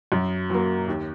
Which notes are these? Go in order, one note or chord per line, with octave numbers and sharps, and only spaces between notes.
F#2
F#3 A#3
D#2